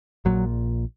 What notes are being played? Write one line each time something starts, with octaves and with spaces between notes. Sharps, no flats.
A#1 A#2 F#3